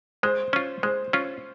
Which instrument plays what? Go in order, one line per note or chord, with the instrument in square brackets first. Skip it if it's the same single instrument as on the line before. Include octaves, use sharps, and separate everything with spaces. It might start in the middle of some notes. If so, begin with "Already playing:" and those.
[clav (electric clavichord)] G#3 [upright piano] C5
[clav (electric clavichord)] C#4 F4
[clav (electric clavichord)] G#3 [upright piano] C5
[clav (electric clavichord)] C#4 F4